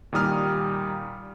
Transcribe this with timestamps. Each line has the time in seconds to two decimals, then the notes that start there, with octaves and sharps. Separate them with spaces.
0.13 A#2 D#3 G3 D#6 F6